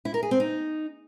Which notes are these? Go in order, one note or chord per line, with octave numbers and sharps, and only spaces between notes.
E4
A#4
G#4
C4
D#4